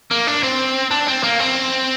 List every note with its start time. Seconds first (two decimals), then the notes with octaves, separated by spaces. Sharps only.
0.11 A#3
0.27 D4
0.43 C4
0.91 D4
1.08 C4
1.24 A#3
1.40 C4